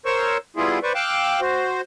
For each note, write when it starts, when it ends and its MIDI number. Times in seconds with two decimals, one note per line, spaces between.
0.06 0.37 70
0.06 0.37 72
0.06 0.37 73
0.06 0.37 85
0.06 0.37 88
0.57 0.79 55
0.57 0.79 59
0.57 0.79 64
0.57 0.79 65
0.57 0.79 68
0.83 0.93 71
0.83 0.93 72
0.83 0.93 74
0.83 0.93 85
0.95 1.40 77
0.95 1.40 79
0.95 1.40 86
0.95 1.40 88
0.95 1.40 90
1.41 1.81 66
1.41 1.81 72